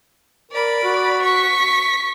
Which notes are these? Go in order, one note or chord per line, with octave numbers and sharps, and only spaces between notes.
A#4 D5 B5
F#4
C#6 B6